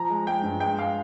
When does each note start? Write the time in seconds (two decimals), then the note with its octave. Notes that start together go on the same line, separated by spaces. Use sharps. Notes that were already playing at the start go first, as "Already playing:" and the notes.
Already playing: F3 A#5
0.10 G#3
0.27 G#3 G5
0.43 G2
0.60 G#3 G5
0.79 F5